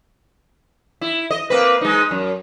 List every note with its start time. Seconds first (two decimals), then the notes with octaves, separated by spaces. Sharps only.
1.01 E4
1.31 D#5
1.50 A#3 C4 B4
1.81 G#3 D#4
2.11 F#2